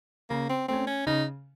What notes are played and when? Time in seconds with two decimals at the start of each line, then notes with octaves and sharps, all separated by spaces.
0.30 C#3 A#3
0.49 C4
0.68 A3 C4 C#4
0.87 C#4
1.06 C#3 D#4